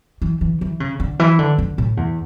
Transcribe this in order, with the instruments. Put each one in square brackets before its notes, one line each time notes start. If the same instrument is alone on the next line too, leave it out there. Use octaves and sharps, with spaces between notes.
[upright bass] E3
E3
E3
C#3
D3
E3
D3
D3
A2
E2